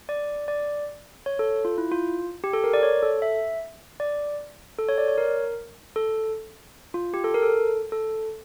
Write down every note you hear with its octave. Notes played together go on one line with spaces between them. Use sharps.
D5
D5
C#5
A4
F4
E4
F4
G4
A4
A#4
D5
C#5
A4
E5
D5
A4
C#5
D5
C#5
A#4
A4
F4
G4
A4
A#4
A4
A4